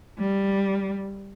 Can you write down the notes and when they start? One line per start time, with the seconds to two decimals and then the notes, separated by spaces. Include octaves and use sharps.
0.19 G3